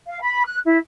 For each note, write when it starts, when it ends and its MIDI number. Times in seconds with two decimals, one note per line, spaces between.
0.07 0.21 77
0.22 0.42 83
0.45 0.58 90
0.64 0.77 64